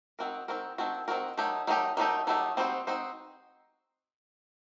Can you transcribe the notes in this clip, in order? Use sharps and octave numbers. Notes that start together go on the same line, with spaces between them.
D#3 A3 C4 F#4 A#4
D#3 A3 C4 F#4 A#4
D#3 A3 C4 F#4 A#4
D#3 A3 C4 F#4 A#4
D#3 F#3 A3 D#4 G4
D#3 F#3 A3 D#4 G4
D#3 F#3 A3 D#4 G4
D#3 F#3 A3 D#4 G4
G3 C4 D#4 F#4 C5
C4 D#4 F#4 C5